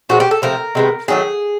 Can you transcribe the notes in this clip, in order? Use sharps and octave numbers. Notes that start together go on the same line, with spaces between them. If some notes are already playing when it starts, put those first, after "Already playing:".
A#2 F3 G#3 B3 F#4
G4
A4
C3 F3 A3 A#4
C3 D#3 G#3 B3
D#3 F#3 A3 G#4